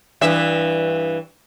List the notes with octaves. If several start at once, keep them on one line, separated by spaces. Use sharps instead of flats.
G2 E3 E5